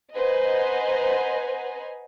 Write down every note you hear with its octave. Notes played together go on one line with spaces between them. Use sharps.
B4 C5 D#5 F#5 G#5 A#5